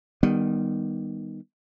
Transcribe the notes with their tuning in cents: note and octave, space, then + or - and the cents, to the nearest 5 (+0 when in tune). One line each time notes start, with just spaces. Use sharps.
D#3 -5 G3 +15 B3 +0